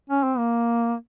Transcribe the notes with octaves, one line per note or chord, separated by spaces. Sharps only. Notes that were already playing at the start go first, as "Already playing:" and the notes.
C#4
C4
A#3